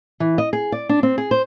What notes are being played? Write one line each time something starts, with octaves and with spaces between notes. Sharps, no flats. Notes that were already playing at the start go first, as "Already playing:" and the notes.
E3
D#5
G#4
D5
D4
C4
G#4
C5